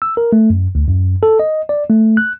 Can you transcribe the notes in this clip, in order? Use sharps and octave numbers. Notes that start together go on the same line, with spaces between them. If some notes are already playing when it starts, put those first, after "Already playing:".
E6
A#4
A3
F#2
D2
F#2
A4
D#5
D5
A3
F#6